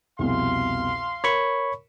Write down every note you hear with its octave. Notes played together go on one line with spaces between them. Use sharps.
C2 F2 B2 F5 C6
A#4 C#5 B5 C#6